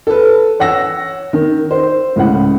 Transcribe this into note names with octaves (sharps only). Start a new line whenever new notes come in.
A4 B4
C#5 F#5 E6 A#6
D#3
C5
C#2 A2 C#3 F#5